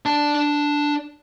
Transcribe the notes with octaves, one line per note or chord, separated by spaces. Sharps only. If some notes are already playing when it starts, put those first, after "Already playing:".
D4 A5